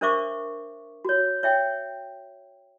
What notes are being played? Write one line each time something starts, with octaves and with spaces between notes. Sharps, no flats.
D4 A#4 C5 E5 C#6 D6
F#4 C#5
C#5 E5 G5